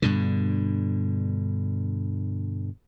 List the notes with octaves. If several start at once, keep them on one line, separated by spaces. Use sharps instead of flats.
G2 B2 D3